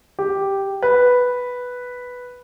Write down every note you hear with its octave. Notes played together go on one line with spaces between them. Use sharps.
G4
B4